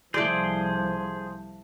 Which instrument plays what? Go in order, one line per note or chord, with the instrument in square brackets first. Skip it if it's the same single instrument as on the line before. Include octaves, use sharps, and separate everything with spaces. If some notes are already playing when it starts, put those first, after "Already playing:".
[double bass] C2 F3 [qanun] A3 D5 [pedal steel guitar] G#4 C5